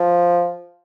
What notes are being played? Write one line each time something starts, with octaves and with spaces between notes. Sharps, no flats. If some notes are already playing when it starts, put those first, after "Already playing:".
Already playing: F3